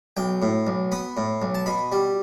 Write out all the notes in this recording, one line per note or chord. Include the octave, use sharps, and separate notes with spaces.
B1 G5
A2
B1
B3 B5
A2
B1
A5
B2 B5
G3